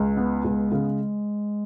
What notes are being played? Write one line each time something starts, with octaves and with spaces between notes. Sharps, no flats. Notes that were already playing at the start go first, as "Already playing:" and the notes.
Already playing: C#2 G#3
B3
C#2
C#3